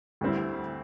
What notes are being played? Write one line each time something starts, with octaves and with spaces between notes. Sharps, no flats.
D2 D3 G3 C4 E4